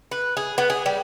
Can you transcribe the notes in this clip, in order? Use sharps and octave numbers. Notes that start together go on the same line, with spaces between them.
B4
G#4
B3
G#4
G3